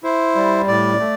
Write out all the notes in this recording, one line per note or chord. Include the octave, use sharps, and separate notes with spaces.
E4 C5
G3
A2 D5
A3